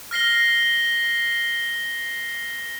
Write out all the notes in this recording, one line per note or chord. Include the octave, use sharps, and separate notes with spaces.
F6 A#6 C7 G7